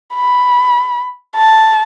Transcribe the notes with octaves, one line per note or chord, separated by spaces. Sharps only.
B5
A5